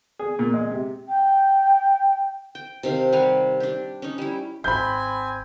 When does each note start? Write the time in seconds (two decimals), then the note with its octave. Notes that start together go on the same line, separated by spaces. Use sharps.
0.19 G#4
0.39 A#2
0.54 G#3
0.70 C3
1.08 G5
2.55 G5
2.83 C3 D#3 F5
3.13 G3 F5 F#5 G#5
3.60 D4 G4
4.02 C#4 D#4
4.18 G3 E4
4.64 G#1 C4 G#5 B5 G6